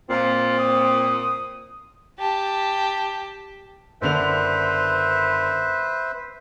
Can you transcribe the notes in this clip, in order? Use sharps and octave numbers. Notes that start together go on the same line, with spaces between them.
A#2 C4 F4
D#6
G4 A5
F#1 D3 B4 C5 E5 F7